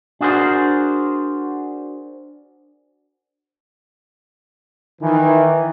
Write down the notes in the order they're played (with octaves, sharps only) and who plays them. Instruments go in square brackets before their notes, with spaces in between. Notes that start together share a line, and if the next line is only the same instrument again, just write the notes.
[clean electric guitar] D4 F#4 G#4 A#4 C5
[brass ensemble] D#3 E3